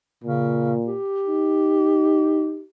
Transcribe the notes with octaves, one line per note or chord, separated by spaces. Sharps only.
A#2 C#3
G4
D#4